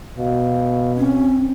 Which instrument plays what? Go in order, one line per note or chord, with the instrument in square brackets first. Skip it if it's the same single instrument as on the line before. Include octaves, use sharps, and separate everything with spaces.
[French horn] B2 [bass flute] F5
[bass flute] C4 [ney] C#4